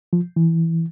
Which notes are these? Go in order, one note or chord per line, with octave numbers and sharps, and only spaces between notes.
F3
E3